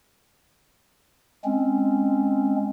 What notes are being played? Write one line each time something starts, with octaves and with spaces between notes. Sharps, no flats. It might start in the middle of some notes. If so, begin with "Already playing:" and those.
G#3 C4 C#4